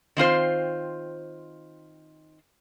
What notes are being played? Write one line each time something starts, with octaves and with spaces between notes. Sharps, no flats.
D#3 C4 F4 C5